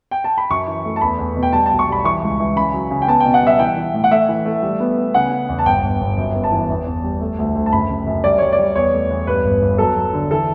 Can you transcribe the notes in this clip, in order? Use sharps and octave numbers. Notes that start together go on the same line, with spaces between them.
G5
A5
B5
F#2 C#6
E3
A3
A5
E2 B5
E2
B2
G5
G3 A5
B1 A5
C#6
G3 B5
E3 C#6
C#2
E3
C#3 B5
F#3
C#3
G5
B3 A5
B2 G5
F#5
G3 E5
E3 G5
E3
A2
F#5
A3 E5
E3
A3
G3
B3
B3
C#3 F#5
C#3
E2
A5
G1 G5
G1
G1
F#2
B3
A5
E3
E2
E2
G3
A3
D2
D2
A5
F#1 B5
F#2
F#2
G3 D5
G3 C#5
D5
G3
E2 C#5
A3
E2
G2 B4
G1
G1
F#3 A4
F#3
D3
E3 A4